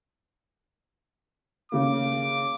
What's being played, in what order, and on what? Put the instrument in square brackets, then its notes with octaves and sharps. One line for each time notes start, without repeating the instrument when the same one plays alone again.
[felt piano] C#3 A#3 [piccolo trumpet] D6